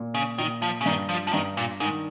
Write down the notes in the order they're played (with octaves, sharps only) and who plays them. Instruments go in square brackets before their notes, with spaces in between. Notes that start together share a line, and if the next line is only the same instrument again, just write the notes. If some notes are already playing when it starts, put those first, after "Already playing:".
Already playing: [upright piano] A#2
[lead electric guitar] C#3
[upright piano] A#2 [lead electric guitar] D#3
[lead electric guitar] F3
C#3
[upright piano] G2 [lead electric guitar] D#3
[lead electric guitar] F3
F3
[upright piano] G2 [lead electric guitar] D#3
[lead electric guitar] A#2
[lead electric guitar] G#2 [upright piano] D#3